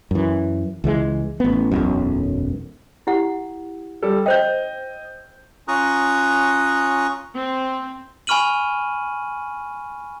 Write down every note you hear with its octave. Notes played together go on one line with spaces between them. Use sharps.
F#2 E3
C#2 E3 F#3 G#3
A1 B3
E1 B1 F#2
E4 G4 F#5
G3 A4
C5 D#5 G5 G6
C#4 F4 A#5 C#6 D#6 F#6
C4
G#5 B5 C#6 F6 D#7 F#7